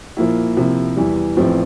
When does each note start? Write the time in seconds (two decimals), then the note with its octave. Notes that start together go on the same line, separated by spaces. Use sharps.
0.17 A#2 F3 A#3 E4
0.57 C3 F3 A#3 E4
0.96 E2 E3 G3
1.36 A1 A2 F3 C4